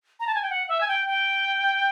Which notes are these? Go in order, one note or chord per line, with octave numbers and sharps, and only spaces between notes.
A#5
A5
G#5
G5
F#5
E5
G#5
G5
G5